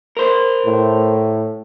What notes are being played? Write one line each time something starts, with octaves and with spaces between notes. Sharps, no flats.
A#4 C5
A2